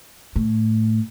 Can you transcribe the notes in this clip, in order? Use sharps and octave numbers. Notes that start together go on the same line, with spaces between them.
A2